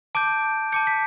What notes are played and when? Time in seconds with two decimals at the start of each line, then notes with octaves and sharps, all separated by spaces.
0.15 A5 D6 G6 D7
0.72 A5 D6 G6 C#7
0.87 B6